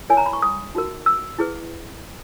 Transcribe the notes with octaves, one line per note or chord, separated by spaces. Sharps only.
E4 A#4 C#5 G#5
A#5
B5
C#6
D#6
D#4 F#4 A#4
E6
E4 G#4 B4